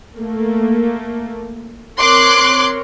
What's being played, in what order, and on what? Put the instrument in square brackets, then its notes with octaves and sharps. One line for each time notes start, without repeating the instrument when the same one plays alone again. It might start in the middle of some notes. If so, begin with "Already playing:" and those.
[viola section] A3 A#3
[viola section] C4 A#4 C#5 [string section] C6 D6 F#6